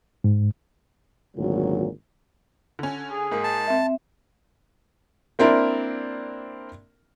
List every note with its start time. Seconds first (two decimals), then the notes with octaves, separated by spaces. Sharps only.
0.24 G#2
1.36 G#1 D2 A#2 F#3
2.79 D3 C#4
3.11 G#4
3.31 G#2 A#3
3.44 A5
3.67 C4 E5
5.39 A#3 C4 D4 E4 A#4